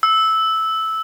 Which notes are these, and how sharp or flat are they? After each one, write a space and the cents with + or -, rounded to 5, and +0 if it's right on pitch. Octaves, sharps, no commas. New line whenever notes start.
E6 -10